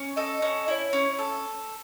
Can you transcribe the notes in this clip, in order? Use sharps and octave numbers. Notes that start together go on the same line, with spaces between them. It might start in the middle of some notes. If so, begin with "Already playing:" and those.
Already playing: C#4
A4 D#5
C#4 D#5
E4 C#5 D#5
C#4
A4